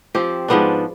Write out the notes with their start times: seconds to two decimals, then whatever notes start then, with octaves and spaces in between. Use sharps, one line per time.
0.15 F3 C4 G4
0.48 G#2 F3 B3 D4